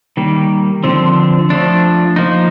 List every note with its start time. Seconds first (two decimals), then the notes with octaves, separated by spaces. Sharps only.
0.17 D#3 G3 A#3
0.84 D3 F3 C4
1.50 F3 A3 D4
2.16 F3 A#3 D#4